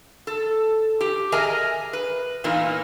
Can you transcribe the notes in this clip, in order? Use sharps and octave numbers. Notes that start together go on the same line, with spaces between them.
A4
G4
G#4 A#4 D#5 E5 G#5 A#5
B4
E2 A#2 E3 A#3 D#4